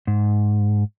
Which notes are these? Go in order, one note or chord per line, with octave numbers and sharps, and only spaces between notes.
G#2